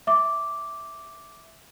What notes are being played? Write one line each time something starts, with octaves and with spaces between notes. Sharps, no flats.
E5 D6